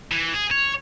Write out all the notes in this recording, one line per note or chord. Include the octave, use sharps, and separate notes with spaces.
E3
G#4
C#5